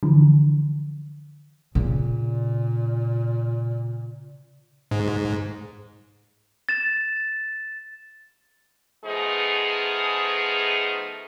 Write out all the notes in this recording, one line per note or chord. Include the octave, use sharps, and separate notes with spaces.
D3 E3 F3
A#2 C#3
G#2
A6 E7
F3 A3 B3 D#4 G#4